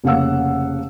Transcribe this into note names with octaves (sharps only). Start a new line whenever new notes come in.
F1 C#3 A#3 F5 F#5 E6